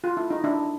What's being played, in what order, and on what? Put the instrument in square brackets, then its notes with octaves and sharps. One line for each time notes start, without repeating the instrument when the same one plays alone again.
[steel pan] F4
E4
D#4
D4 E4